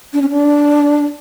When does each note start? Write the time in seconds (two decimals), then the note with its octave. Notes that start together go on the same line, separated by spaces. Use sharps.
0.13 D4
0.22 C#4
0.30 D4